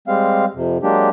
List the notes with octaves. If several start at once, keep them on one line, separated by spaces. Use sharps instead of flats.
G3 G#3 C4 F5
F2 C3
F#3 G#3 A#3 D4 G4